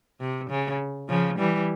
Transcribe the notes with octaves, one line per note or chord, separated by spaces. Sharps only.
C3
C#3
C#3 F3
E3 G3